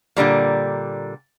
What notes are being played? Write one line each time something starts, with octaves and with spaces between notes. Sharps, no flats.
A#2 D3 G3 A#3